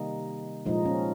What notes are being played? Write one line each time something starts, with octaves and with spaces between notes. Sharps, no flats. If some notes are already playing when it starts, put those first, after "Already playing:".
Already playing: C3 D#3 G3 A#3 D#4
A#2 F3 G#3 D#4
C#4